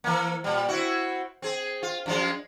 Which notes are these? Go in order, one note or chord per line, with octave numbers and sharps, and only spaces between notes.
E3 A#3
A#2 G3
C4 E4 F#4
C4 G#4
F4
F#2 F3 G#3